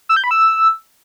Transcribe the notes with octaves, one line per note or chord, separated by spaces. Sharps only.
E6
G6
B5
E6